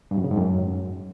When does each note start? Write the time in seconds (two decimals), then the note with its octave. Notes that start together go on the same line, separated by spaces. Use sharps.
0.11 G2
0.18 F#2
0.24 C#3
0.31 G#2
0.38 F#2